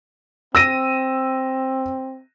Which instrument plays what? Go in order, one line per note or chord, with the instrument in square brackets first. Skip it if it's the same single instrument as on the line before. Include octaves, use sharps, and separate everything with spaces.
[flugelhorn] C4 [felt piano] E6 A#6 D#7